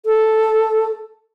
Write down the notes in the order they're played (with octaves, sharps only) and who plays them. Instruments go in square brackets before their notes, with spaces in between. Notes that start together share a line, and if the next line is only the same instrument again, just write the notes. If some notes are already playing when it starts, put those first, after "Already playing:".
[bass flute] A4